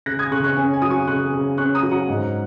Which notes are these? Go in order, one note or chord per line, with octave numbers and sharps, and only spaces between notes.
C#3 F#6 A#6
D#6 G#6
C#3 C#6 F#6
C#6 F#6
C#4 G#5
G#5
F#3 D#6
G#5 C#6
C#3 C#6 F#6
C#3
C#4 C#6 F#6
A#5 D#6
F#3
F#5 A#5
G#2